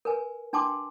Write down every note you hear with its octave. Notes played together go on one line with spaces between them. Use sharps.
A#4 B4 G#5
D4 G5 A5 C6 D6